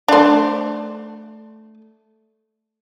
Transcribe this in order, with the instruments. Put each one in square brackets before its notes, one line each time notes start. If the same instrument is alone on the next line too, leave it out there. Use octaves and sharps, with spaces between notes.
[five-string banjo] A3 D5 [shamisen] D4 C5